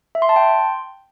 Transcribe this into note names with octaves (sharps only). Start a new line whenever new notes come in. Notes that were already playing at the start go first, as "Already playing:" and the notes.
E5
C6
A5
G5
C6